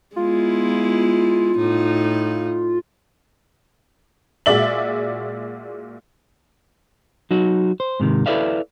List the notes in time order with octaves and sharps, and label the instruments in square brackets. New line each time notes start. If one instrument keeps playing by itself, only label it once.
[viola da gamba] G#3 B3 E4 [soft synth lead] F4
[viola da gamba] A2 D#4
[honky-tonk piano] A#2 G#3 F#4 D5 E5 F#7
[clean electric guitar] F#3 D#4 F#4
C5
G#2 C3 D#3
E4 A4 B4 D5 E5 F5